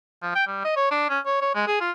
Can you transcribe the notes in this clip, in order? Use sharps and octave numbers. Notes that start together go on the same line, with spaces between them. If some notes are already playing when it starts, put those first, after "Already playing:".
F3
G5
G3
D#5
C#5
D4
C#4
C#5
C#5
G#3
G#4
F4